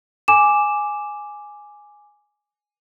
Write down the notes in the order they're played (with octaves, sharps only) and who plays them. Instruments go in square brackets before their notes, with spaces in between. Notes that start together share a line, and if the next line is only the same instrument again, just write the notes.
[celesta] G#5 D6 E7